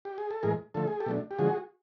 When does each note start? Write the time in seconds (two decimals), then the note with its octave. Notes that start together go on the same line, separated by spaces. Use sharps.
0.05 G4
0.18 G#4
0.31 A4
0.43 A2 E3 G#3 G#4 A#4
0.74 D3 F3 A3 A4
0.88 G#4
1.00 G4 A4
1.06 B2 F#3 A3 D4
1.31 G4
1.38 D3 F3 G#3 F#4 G#4